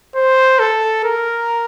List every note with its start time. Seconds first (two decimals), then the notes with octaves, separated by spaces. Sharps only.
0.15 C5
0.59 A4
1.04 A#4